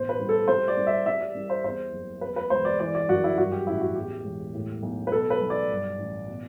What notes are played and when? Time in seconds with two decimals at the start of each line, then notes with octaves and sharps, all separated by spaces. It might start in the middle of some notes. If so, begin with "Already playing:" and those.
Already playing: A1 B2 C5
0.09 B4
0.19 C2
0.29 A4
0.48 C3 C5
0.68 D5
0.77 C2
0.87 E5
1.06 C3 E5
1.21 D5
1.35 C2
1.50 C5
1.64 E2 C5
1.93 F#1
2.21 E2 B4
2.36 B4
2.50 E1 C5
2.65 D5
2.79 E3 D5
2.95 D5
3.09 F#2 F#4
3.24 E4
3.38 G2 F#4
3.52 G4
3.67 A1 E4
3.81 F#4
3.95 E2 G4
4.25 E1
4.54 A2
4.83 B1
5.07 B4
5.11 B2 A4
5.30 B4
5.41 B1
5.50 D5
5.69 G2
5.98 A1
6.28 B2